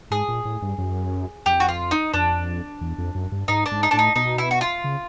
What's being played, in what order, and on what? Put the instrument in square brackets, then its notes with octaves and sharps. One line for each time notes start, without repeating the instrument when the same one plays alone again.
[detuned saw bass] G#2 [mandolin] G#4
[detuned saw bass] A#2
A2
G2
F#2
[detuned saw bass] F2 [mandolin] G4
[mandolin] F#4
F4
D#4
[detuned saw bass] F2 [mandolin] D4
[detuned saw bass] E2
F2
F#2
G2
[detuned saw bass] G#2 [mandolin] D#4
[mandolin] D4
[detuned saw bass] G#2
[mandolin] D#4
[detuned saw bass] A2 [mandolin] D4
[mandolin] D#4
[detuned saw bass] B2 [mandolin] D#4
[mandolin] E4
F#4
F4
[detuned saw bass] C#3